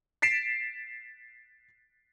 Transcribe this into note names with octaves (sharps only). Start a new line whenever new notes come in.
A6 B6 C7 D7 E7